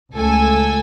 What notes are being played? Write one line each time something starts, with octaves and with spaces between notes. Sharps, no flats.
C#2 A3 A4 G#5 E6